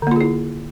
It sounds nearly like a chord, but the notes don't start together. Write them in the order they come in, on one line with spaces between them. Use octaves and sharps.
D3 A#3 F4 G#4 E4